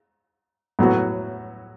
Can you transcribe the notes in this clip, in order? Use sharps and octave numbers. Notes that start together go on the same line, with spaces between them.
A2 F#3 B3 F#4